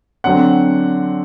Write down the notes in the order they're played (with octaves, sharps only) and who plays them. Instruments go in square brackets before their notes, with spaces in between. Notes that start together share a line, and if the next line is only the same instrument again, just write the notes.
[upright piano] D3 F#3 C4 F#5